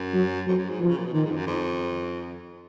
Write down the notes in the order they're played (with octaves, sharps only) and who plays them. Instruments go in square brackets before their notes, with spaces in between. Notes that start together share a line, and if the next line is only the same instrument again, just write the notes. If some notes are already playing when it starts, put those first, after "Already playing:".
Already playing: [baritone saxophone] F#2
[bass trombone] F#3
[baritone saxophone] F2 [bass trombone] F#3
[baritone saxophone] F#2
G#2
[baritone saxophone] B2 [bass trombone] F3
[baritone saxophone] C#3
A#2
B2
[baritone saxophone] A#2 [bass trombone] D#3
[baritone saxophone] G#2
F2
F#2
F2